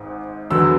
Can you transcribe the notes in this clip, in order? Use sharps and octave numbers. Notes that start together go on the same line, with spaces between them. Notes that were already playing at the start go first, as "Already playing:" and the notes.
Already playing: G#1 G#2
E2 D3 F#3 B3 E6